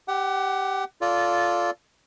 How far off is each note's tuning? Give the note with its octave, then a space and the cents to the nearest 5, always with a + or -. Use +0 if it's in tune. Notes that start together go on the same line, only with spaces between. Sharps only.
G4 +0 F#5 +30
F4 +0 A4 -10 D5 -20